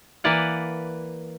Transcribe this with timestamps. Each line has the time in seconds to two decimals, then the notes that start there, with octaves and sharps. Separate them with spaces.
0.24 E3 A#3 B4 D5 F#5